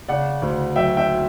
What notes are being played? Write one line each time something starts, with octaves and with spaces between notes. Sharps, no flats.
C#3 D5 F#5
D2
F#3 E5 G5
E5 G5